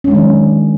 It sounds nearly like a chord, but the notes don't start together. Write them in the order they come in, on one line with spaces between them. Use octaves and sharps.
C#4 G#3 D4 D#3 F#3